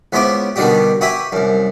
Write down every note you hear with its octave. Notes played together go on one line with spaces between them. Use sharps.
C#2 B3 C#4 E4 C5 D6
B2 D3 D#3 G3 F#4 G4
F#4 G4 B4 E5 G#5
C2 F#2